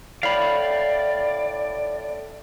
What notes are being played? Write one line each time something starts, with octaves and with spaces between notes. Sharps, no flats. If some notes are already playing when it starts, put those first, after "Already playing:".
A2 D5 F5 B5